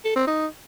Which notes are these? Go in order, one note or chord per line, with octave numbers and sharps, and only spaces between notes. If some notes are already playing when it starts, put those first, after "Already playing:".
A4
C4
D#4